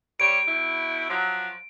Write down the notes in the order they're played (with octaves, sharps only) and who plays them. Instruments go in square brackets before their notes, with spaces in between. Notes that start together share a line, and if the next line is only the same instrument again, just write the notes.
[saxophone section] G3 C#5 [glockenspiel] D7
[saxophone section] B2 E4
F3 F#3